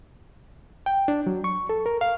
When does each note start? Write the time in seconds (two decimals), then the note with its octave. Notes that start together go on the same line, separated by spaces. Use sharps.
0.86 G5
1.08 D4
1.27 F#3
1.44 C#6
1.69 A4
1.86 A#4
2.01 F5